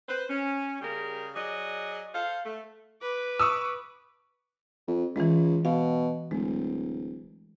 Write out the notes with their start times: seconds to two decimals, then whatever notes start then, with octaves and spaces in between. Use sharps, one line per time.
0.08 B4 C5
0.30 C#4
0.81 C#3 G3 G4 G#4 A#4
1.35 F#3 G#4 D5 D#5
2.14 A4 C5 F5
2.44 A3
3.01 B4 D6
3.40 C#6 D#6 E6
4.88 F2
5.16 C#2 E3 G#3
5.65 B2 F5
6.31 D1 G#3